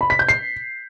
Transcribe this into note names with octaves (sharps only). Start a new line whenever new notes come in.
B5
B6
G6
C7